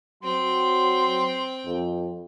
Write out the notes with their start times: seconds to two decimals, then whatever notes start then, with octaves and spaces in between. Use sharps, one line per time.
0.23 F#3 C4 G5 C6
1.66 F2